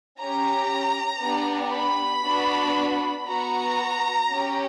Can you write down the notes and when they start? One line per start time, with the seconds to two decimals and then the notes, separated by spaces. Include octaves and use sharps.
0.17 C#4 G4 A#5
1.21 B3 D4 G4
1.72 B5
2.24 B3 D4 F#4
3.27 B3 F#4 A#5
4.30 C#4 G4